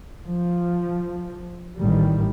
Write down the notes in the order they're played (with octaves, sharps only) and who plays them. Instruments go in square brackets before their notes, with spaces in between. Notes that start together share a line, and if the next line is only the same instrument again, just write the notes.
[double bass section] F3
A1 D#3 G3